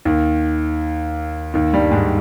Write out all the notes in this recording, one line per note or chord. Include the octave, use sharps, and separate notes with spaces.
D#2 D#3
D#2 D#3
G2 G3
G#2 G#3